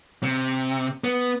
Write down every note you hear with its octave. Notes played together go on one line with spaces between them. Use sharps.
C3
B3